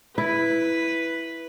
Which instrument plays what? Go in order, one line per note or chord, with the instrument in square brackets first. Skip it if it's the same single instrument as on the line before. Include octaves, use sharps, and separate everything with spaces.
[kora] E4 [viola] B4